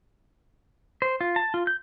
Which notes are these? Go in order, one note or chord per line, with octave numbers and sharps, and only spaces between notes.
C5
F4
A5
F4
G6